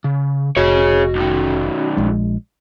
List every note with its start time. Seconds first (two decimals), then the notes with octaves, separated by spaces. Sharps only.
0.04 C#3
0.57 F1 F#4 G#4 C#5 D#5
1.16 B1 D#3
1.97 A#1 G#3